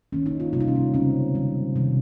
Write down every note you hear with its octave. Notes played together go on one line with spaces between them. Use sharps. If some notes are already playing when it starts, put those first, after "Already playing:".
D#3 A#3 C#4
D#4
F4
C3 D#3 G3 A#3 F4
D#4
C#4
D#4
C#3 G#3 C4 C#4
D#3 G3 C4
C3 D#3 G3